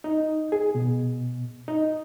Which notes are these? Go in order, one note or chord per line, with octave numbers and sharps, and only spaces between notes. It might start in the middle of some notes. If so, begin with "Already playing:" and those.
D#4
G#4
B2
D#4